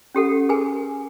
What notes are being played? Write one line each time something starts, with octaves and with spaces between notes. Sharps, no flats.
C#4 G4 A4 F#5
G#4 A#4 B4 G#5